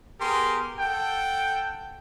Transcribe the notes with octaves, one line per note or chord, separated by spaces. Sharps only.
B3 G4 G#4 A#4 C6
A4 F#5 G5